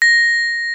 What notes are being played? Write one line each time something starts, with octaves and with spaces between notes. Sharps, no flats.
A#6